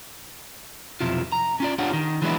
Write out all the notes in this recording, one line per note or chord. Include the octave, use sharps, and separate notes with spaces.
B1 F2 C3 E4 F4
A#5
C#4 F4 D5
D4 F4 G4 G#4 C#5 F#5
D#3
E3 F#3 G#3 B3 D4 E4